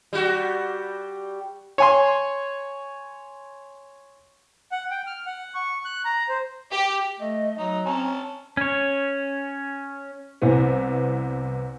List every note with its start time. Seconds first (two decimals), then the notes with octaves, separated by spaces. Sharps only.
0.13 G3 F#4
1.78 C#5 G#5 C6
4.72 F#5
4.91 G5
5.07 F6
5.26 F#5
5.54 C#6
5.85 F#6
6.05 A#5
6.29 C5
6.71 G4
7.19 A3 D#5
7.58 F#3 D#4 A#5
7.86 C4 C#4 A5
8.57 C#4 C#5
10.42 C2 C3 E3 B3